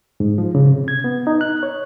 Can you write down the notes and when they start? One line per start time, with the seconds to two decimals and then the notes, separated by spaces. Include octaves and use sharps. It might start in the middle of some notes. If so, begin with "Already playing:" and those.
0.20 G#2
0.38 F3
0.55 C#3
0.67 C3
0.88 G#6
1.04 B3
1.27 D#4
1.41 F#6
1.63 C#5